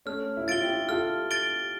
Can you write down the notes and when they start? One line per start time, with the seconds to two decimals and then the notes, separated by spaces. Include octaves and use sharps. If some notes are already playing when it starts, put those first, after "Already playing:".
0.06 A3 C#4 F6
0.37 E4
0.48 F4 A6 D7 G7
0.62 E4 G4
0.89 F4 A4 F6
1.31 A6 D7 G7